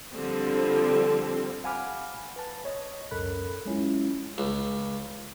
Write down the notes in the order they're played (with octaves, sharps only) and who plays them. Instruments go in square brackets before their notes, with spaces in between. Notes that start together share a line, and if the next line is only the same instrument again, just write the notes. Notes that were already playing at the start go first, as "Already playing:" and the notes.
[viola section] D3 F3 G3 C4
[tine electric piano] F5 F#5 G#5 B5 D6 F6
B4 A5
C#5 D#5
C#2 F#2 A4 A#4 B5 F#6
F#3 G#3 C#4 E4 F4
[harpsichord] C#2